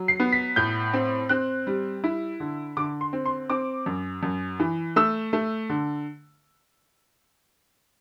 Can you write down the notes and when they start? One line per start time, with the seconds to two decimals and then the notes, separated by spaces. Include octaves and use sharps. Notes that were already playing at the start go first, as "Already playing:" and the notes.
Already playing: F#3
0.08 C7
0.20 B3
0.32 B6
0.56 A2 G6
0.93 C4
1.29 C4 F#6
1.67 G3
2.04 E4
2.40 D3
2.77 D3 D6
3.01 C6
3.13 C4
3.26 C6
3.50 C4 D6
3.86 F#2
4.23 F#2
4.60 E3
4.96 A3 E6
5.33 A3
5.69 D3